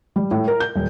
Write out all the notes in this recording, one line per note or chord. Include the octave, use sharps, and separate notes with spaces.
G3
A2
A#4
G6
D#1